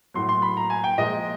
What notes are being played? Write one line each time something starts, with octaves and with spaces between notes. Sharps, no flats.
A2 F#3 C6
C6
B5
A#5
G#5
G5
A#2 F3 G#3 D#5